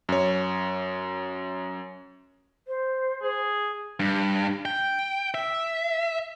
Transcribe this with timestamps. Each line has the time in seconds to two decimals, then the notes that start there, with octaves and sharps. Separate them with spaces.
0.09 F#2 C#5
2.68 C5
3.22 G#4
4.00 G2
4.65 G5
5.34 E5